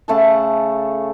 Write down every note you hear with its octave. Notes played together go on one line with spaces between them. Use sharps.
C#3 A3 F#5 A5